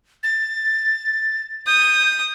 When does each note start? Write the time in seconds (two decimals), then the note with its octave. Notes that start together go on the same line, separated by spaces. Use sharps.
0.23 A6
1.67 D#6 G6